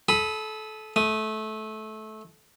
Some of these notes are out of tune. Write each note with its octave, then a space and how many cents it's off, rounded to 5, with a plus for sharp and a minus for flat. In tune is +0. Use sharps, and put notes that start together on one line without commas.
A4 -25 B5 +0 D#6 +0
A3 -20 D#6 +0